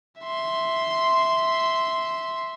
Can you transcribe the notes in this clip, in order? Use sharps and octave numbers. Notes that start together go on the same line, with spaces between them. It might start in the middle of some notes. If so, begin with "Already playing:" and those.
E5 C6